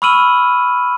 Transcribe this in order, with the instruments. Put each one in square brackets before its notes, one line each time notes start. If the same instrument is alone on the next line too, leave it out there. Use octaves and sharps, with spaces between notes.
[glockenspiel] B5 C#6 E6 F6 D#7 F#7